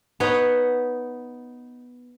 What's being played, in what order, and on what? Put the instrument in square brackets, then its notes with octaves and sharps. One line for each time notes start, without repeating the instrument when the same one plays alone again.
[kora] B3 D#4 B4 C#5